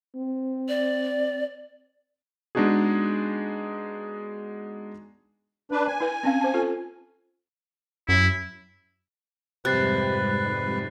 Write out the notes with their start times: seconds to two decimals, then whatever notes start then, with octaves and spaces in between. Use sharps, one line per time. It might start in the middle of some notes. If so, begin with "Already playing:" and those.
0.16 C4
0.69 D5
2.55 G#3 B3 D4 D#4 F#4 G#4
5.72 D4 B4
5.87 G#5
6.00 E4 B4
6.23 C4 C#4 F5
6.41 C5 A5
6.54 F4 A4
8.09 F#2 E4
9.65 F2 G#2 C3 G3 B4 F#6 A6 C7